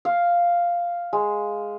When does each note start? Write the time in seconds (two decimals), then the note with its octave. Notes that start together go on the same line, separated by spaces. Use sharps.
0.05 F5
1.13 G#3